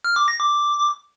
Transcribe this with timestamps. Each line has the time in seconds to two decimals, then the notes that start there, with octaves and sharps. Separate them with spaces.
0.04 F6
0.16 D6
0.28 A#6
0.40 D6